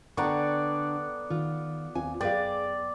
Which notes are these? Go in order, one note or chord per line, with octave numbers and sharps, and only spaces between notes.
D3 B3 D5 F#5 G5 A#5 C#6
D#3 F4
D#2 C4 F4 G#5
F#2 G#4 B4 D5 F5 G5